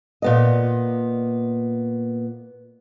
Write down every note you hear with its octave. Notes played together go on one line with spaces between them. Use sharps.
A#2 B3 D#5